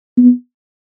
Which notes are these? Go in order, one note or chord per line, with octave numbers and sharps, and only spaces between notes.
B3